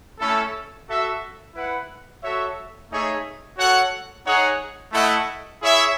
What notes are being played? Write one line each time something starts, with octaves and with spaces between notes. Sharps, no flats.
A3 C#4 E4 A4
F#4 A4 E5
E4 B4 F#5
F#4 A4 C#5 E5
A3 D#4 G#4 C#5 E5
F#4 A4 C#5 F#5
D#4 G#4 C#5 F#5
A3 E4 A4 D#5 F#5
E4 G#4 C#5 E5